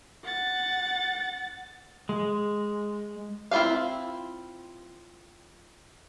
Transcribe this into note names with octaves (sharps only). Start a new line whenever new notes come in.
F#5 A6
G#3
C4 E4 F4 G#4 F5